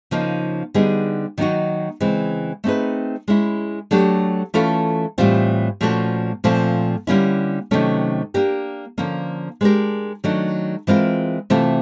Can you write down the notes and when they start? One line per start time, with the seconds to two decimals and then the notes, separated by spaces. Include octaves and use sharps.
0.11 C#3 F3 A#3 D#4
0.74 D3 G3 B3 D#4 G#4
1.38 D#3 F#3 A#3 D#4 F#4
2.00 C#3 E3 G#3 C4
2.64 A3 C4 D#4 G#4 B4
3.28 G#3 C#4 E4
3.91 F#3 A3 D4 G4
4.54 E3 A3 C#4 F4 A4
5.18 A2 E3 G3 C4 F4
5.81 A#2 F3 A3 C#4 F#4
6.44 A#2 F3 A3 C4
7.07 D3 G3 A#3 C#4 E4
7.71 C3 D#3 F#3 A3 C#4
8.34 A#3 D4 G4 A#4
8.98 D3 F3 A#3 C#4
9.61 G#3 B3 D4 G4 A#4
10.24 D#3 F#3 A3 D4
10.87 E3 G#3 C4 F4 A#4
11.50 C3 E3 A3 C4 F4